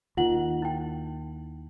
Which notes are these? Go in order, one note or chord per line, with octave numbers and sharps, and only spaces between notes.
D#2 D#3 F4 F#5 F#7
E4 G5